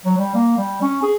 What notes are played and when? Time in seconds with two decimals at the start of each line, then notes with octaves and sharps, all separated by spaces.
0.05 F#3
0.18 G3
0.35 A#3
0.57 G3
0.82 C#4
1.02 G#4